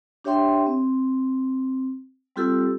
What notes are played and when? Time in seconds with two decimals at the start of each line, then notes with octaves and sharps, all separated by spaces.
0.24 D4 G4 C#5 E5 G5 C6
0.66 C4
2.36 G3 C4 F4 G4 A4 E6